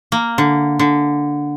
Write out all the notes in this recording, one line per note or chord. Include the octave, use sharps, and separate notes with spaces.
A#3
D3
D3